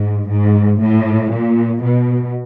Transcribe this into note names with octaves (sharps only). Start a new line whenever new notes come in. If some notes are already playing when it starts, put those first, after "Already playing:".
Already playing: G#2
G#2
A2
A#2
B2